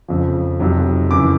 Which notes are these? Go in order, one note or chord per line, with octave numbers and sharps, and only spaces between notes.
F2 C#3 F3
F2 C3 D#3 F#3
F#2 C#3 E3 D6